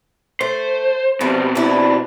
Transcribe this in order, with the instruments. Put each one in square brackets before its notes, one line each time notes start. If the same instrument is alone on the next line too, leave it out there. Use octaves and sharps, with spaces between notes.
[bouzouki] A3 [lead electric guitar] C5
[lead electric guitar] B2 C4 [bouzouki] F3 G3
[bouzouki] D4 E4